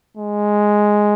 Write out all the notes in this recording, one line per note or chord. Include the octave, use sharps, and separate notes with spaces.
G#3